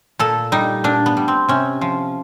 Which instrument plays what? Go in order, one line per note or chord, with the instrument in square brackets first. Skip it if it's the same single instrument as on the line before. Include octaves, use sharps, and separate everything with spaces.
[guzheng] A#2 A4
G3 D#4
A#2 D4
B3
G3
C4
C3 C#4
F3